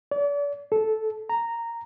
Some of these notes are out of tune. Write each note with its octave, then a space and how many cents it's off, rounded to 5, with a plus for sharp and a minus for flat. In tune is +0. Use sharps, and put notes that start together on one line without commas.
D5 -40
A4 -10
A#5 -10